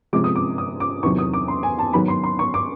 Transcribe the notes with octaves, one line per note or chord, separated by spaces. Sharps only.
C3 F3 G#3 C#4 D6
D#6
D6
D#6
D6
E2 C3 D#3 F#3 C#6
D#6
D6
C6
G#5
A5
G#2 D#3 F#3 B3 B5
C6
C6
C#6
D6